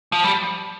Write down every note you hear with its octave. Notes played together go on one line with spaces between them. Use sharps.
F3
G3